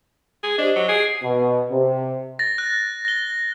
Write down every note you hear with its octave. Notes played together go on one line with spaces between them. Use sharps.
G#4
D4 G4 C5 D#5
F#3
G#4 C7 D7
B2
C3
A6 A#6
F#6
A#6 G7